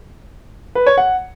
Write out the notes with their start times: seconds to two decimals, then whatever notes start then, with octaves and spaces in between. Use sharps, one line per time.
0.75 B4
0.86 C#5
0.98 F#5